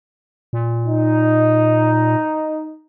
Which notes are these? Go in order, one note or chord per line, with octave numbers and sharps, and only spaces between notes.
A#2
D#4